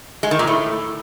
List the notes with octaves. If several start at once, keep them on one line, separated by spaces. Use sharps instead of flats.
G#3
D#3
A#2
A2